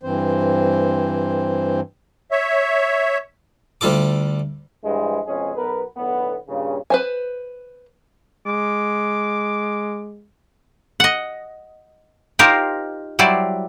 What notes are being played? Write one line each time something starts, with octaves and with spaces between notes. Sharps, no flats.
G2 E3 C4 C5
C#5 E5
D2 G3 F4 A4 D6
G2 E3 F3 G#3
F2 B2 G#3 C#4 G#4
B1 B3 A#4 B4
B1 A2 D3 B3
G2 A#2 C#3
B4 C5 G#5
G#3 D6
D#5 F#5
D#4 F4 G4 A#4 C5
F#3 G3 E4 C5 D5